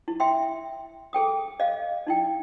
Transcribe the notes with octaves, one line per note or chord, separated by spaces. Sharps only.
E4
E5 G5 C6
G#4 A4 G5 D#6
D#5 F5
D#4 E4 G5